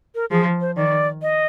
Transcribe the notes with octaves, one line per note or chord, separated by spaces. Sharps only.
A#4
F3 G#4
C5
D#3 D5
D#5